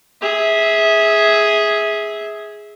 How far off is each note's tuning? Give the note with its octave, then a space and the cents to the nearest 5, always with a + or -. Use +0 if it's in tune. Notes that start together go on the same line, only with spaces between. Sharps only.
G#4 +0 E5 -20